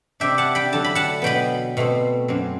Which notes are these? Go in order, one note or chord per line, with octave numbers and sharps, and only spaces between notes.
C3 G3 D4 E5 G5
F#5 A5
G5 B5
D3 F#3 A3 E4 A5
B5
F#5 A5
B2 F#3 B3 G5 B5
B2 A3 C4
F#2 F#3 C4